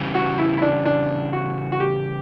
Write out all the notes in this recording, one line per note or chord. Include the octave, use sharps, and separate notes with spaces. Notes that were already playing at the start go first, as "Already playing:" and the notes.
Already playing: C#3 E3 G3
F#4
E4
E4
D4
D4
F#4
F#4
G4